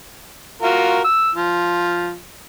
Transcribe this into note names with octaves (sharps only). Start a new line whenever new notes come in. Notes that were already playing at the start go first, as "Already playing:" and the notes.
F4 F#4 A#4
E6
F3